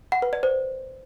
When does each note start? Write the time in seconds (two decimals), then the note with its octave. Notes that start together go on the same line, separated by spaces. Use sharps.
0.12 F#5
0.22 B4
0.33 D5
0.43 C5